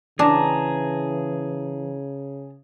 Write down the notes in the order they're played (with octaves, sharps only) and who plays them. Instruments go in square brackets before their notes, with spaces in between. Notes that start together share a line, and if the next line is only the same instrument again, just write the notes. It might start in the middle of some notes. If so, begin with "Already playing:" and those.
[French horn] C#3 [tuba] E3 [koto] D4 [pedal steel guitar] G#4 A5 A#5